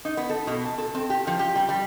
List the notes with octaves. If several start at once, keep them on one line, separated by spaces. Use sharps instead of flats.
D#4
B3
A4
B2
A5
A4
C4
G4
F3
G4
G3
G3